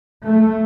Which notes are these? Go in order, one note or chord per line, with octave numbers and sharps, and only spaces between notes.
A3